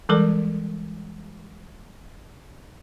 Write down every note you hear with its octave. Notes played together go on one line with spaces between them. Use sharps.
E3 G3 G#3 A4 A#4 D5